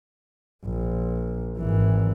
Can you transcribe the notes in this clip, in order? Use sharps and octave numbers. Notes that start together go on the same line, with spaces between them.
A#1
G#1 E3